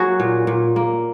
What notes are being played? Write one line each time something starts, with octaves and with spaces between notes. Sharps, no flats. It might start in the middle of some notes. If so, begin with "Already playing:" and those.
Already playing: F#3 A#3 F#4 G#4
A#2
A#2
A#3